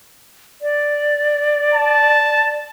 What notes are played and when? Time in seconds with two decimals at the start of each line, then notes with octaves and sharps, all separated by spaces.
0.62 D5
1.74 A5